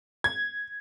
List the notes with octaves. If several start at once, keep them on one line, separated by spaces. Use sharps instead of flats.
G#6